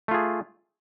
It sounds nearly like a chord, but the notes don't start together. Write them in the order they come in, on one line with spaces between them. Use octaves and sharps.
A3 F4 G#4